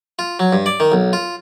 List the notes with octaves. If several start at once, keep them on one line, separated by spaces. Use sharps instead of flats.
F4
F#3
G2
D5
D#3
B1
F4